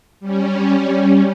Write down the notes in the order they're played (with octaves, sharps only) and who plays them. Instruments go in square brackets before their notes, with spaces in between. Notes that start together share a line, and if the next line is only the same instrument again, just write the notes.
[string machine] G3 C#4